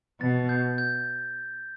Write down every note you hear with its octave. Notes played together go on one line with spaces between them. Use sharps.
B2 A6
G6
G6